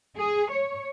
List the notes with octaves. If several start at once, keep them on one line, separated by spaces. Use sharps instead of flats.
G#4
C#5